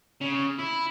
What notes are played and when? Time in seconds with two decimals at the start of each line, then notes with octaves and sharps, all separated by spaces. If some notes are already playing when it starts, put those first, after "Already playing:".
0.21 C#3
0.59 E4